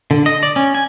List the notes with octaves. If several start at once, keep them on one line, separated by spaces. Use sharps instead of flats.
D3
D#5
D5
C#4
G#5